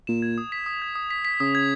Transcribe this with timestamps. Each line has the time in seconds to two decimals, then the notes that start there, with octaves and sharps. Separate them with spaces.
0.07 A#2 E7
0.22 G#6
0.38 D#6
0.52 B6
0.66 D#6
0.82 G#6
0.95 D#6
1.10 B6
1.25 B6
1.40 C#3 D#6
1.55 G#6